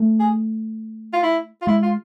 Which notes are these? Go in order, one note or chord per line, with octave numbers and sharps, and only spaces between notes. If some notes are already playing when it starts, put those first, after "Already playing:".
Already playing: A3
G#4
F4
E4
F4
G#3 E4
F4